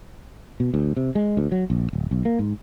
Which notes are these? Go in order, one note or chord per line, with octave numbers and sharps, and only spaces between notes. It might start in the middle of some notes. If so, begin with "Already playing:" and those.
B2
D2
C3
G#3
D2
F#3
A#1
D1
B1
A#3
G#2